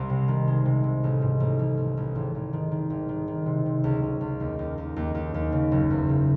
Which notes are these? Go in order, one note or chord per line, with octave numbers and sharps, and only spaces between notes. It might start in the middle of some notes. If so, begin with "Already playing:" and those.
Already playing: C2
C3
D#3
G#3
C3
C3
A1
G#2
A1
A1
A1
A1
G#1
G#1
D#3
D#3
G#1
D#3
D#3
C3
C3
C#2
C#2
C#2
D#2
D#2
D#2
D#2
D#2
D#2
C#3
F#1
E2
C#3